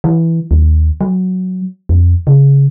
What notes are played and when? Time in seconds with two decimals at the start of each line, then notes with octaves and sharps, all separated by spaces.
0.04 E3
0.51 D#2
1.01 F#3
1.89 F2
2.27 C#3